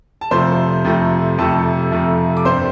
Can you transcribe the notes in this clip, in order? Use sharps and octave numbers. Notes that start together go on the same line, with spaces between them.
A5
F2 C3 F3 A3 C5 C6
F2 C3 F3 A3
F2 C3 F3 A3 A4 A5
F2 C3 F3 A3
D6
G2 G3 C4 C5 C6